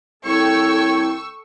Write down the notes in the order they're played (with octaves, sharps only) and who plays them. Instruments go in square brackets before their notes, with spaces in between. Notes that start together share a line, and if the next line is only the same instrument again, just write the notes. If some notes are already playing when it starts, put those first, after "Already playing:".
[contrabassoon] C2 [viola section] A4 G5 [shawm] C#5 [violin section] C#6 E6